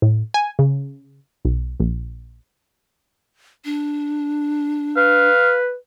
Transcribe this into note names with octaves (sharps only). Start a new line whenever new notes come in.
A2
G#5
C#3
B1
A#1
D4
B4 F5